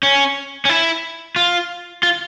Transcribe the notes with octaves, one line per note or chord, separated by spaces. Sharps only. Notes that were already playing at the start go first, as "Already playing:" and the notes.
C#4
C#4
E4
F4
F4